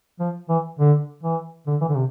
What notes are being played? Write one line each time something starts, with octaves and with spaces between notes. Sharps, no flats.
F3
E3
D3
E3
D3
E3
D3
C3